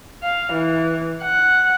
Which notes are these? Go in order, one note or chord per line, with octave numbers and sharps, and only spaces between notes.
F5
E3
F#5